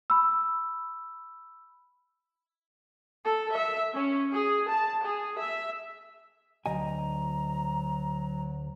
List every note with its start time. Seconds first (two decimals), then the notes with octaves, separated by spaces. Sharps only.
0.10 B5 E6
3.24 A4
3.54 E5
3.95 C#4
4.32 G#4
4.69 A5
5.04 G#4
5.41 E5
6.66 D2 F#3 D#5 G#5 A#5